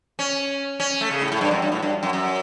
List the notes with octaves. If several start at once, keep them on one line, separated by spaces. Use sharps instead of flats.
C#4
C#4
A3
C#3
A2
A2
G2
F#2
G2
A2
G2
F#2
F#2